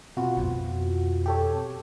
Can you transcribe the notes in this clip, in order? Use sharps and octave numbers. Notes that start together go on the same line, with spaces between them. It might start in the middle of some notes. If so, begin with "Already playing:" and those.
B2 C4 F4 F#4
F2 B3
G4 A4 C#5